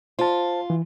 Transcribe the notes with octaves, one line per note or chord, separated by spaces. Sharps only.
F4 C5 A5
E3